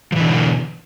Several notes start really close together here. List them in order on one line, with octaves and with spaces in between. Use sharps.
F3 E3 D3 B2